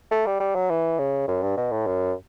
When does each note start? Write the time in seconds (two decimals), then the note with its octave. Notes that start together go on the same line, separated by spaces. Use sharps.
0.11 A3
0.26 G3
0.40 G3
0.55 F#3
0.70 E3
0.98 C#3
1.27 F#2
1.43 G2
1.57 B2
1.71 A2
1.87 F#2